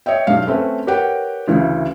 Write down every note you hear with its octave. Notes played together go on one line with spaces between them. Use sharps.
C#5 D#5 E5 G5
B1 G2 G3 F5
A3 C4 C#4 B4
G4 A#4 B4 C#5 F#5 G5
D2 C#3 E3